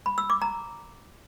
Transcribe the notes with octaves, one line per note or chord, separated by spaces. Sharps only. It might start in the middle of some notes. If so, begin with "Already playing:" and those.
B5
E6
D6
A#5